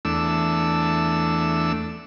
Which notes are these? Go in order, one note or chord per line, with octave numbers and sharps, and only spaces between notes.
E2 A3 D4 E6